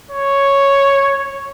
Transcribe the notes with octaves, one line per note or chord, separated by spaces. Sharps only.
C#5